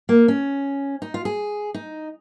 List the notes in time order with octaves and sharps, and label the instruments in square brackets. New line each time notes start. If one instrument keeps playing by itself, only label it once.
[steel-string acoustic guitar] A#3
C#4
D#4
F4
G#4
D#4